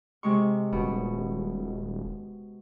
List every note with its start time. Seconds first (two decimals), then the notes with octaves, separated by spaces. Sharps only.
0.23 C3 G#3 C#6
0.72 D#1 B2